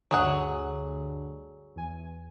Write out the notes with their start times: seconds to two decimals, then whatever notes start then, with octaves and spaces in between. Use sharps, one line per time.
0.11 D2 G2 D3 F#3 G#4 F#5
1.76 E2 G#5